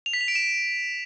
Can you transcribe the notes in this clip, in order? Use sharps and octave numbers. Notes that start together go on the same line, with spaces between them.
F7
B6
F7
D7
E7